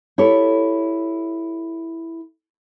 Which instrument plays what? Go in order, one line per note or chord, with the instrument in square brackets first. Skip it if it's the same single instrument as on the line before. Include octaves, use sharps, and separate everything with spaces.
[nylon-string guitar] E4 G4 A4 C#5